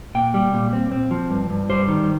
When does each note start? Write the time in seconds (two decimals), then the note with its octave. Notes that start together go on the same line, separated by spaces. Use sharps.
0.15 A#2 G5
0.34 G3
0.53 A#2
0.73 C4
0.92 C4
1.11 F3
1.30 G2
1.50 G2
1.70 G3 C5
1.88 D#3